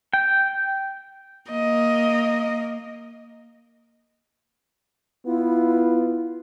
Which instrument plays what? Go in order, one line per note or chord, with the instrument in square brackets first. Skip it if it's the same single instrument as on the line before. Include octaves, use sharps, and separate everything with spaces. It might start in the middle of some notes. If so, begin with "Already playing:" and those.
[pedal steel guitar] G5
[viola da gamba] A#3 [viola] D#5
[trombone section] B3 F4 [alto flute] E4